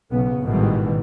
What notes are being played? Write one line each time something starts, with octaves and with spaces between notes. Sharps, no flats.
B1 C#3 B3
A1 G#2 B2 D#3 E3 G3